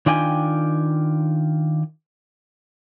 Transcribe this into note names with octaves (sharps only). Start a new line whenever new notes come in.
D#3 D4 F4 G5 G#5